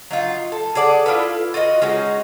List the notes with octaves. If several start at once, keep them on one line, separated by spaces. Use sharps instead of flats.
F#3 D#4 F4
A4
G#4 A4 D5 F#5
E4 F4 A4 B4
F4 F#4 B4 D#5
G#3 C#4 D#4 F#4